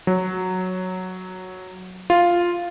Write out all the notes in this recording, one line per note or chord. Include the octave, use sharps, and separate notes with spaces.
F#3
F4